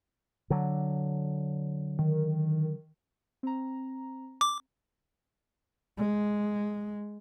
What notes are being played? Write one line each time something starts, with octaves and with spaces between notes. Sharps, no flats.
D3 F#3
D#3
C4 A#5
D6
G#3